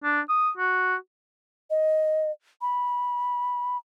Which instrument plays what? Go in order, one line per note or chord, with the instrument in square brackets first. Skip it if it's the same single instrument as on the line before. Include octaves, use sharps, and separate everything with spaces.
[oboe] D4
D#6
F#4
[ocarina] D#5
B5